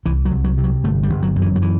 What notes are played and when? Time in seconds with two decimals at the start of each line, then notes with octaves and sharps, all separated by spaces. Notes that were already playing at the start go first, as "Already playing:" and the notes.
0.06 C2 E3
0.25 F#3
0.31 C2
0.44 F#3
0.58 C3
0.64 F#3
0.84 G1 A3
1.03 G3
1.09 G1
1.23 F#3
1.36 F#2
1.42 E3
1.56 F#3
1.62 E3